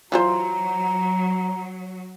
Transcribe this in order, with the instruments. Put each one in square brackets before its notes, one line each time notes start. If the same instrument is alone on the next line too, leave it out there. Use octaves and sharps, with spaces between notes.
[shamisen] E3 F4 C5 [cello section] F#3 [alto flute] A#5